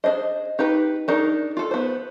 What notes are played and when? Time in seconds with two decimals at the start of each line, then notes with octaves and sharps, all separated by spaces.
0.04 D4 G#4 C5 D#5
0.59 D#4 G4 B4
1.08 D4 D#4 G#4 A#4
1.57 F4 A4
1.71 B3 C5